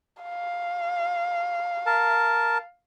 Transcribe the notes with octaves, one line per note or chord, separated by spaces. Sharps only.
F5
A#4 A5